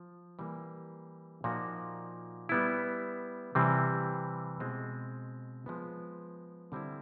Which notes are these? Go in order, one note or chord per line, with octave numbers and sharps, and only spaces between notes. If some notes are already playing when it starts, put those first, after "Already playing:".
Already playing: F3
E3 G3 A#3
A#2 F3 A#3 D#4 F#4
G3 B3 E4
C3 E3 G3 C4
B2 G#3 C4
F3 G#3 B3
D3 G3 C4 E4